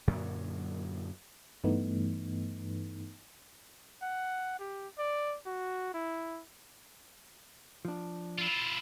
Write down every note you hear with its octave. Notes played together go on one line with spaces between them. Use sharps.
F#2 A#2 D3 F#3
G2 E3 A3 B3 D#4
F#5
G4
D5
F#4
E4
F3 D4
E4 F4